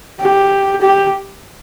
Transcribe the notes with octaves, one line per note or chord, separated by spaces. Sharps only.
G4
G4